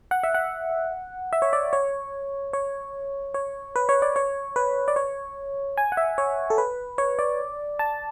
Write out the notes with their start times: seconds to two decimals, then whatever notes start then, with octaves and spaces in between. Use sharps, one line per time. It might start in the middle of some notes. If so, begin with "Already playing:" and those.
0.11 F#5
0.23 E5
0.35 F#5
1.33 E5
1.42 C#5
1.53 D5
1.73 C#5
2.53 C#5
3.34 C#5
3.76 B4
3.89 C#5
4.02 D5
4.16 C#5
4.56 B4
4.88 D5
4.96 C#5
5.78 G#5
5.92 F#5
5.97 E5
6.18 C#5
6.50 A4
6.58 B4
6.98 C#5
7.19 D5
7.79 A5